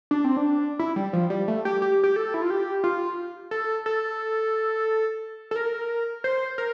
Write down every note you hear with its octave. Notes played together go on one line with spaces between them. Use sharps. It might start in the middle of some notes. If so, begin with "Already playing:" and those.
D4
C4
D4
E4
G3
F3
G3
A3
G4
G4
G4
A4
E4
F4
G4
F4
A4
A4
A4
A#4
C5
A#4